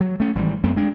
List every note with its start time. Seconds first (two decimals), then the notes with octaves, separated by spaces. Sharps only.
0.01 F#3
0.20 A3 C#4
0.35 G#1 E3 G3
0.64 F#2 A3 B3 C4
0.76 G#3 D4